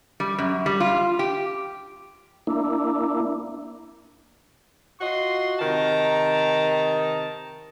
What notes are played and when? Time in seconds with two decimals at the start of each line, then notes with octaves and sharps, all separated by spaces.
0.20 G3
0.38 F#2
0.66 G3
0.80 F4
1.19 G4
2.47 A#3 D4 E4
5.00 F4 F#4 D#5 C6
5.60 C3 D#3 A5 A#5